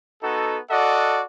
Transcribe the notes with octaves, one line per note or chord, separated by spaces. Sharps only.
B3 D#4 F#4 A4
F#4 A4 D5 D#5 F#5